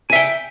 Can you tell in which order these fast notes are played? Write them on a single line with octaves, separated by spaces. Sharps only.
G#5 E5 G5